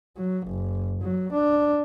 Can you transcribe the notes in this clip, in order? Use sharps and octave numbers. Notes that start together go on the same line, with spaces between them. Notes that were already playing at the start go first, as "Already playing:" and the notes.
F#3
F#1
F#3
D4